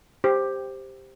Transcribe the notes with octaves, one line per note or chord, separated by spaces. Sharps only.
G4 C5